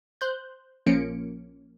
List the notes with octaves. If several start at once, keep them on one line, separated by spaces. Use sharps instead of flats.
C5 F#6 G6
A#1 F3 A#3 C#4 C#7 D7